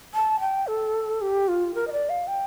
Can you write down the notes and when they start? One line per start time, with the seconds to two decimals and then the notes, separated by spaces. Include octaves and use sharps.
0.14 A5
0.40 G5
0.67 A4
1.21 G4
1.48 F4
1.75 A#4
1.87 D#5
1.92 D5
2.09 F5
2.27 G5